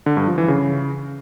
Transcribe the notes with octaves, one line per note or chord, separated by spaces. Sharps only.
D3
G2
F3
E3
C#3